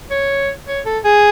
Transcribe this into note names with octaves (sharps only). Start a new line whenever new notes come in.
C#5
C#5
A4
G#4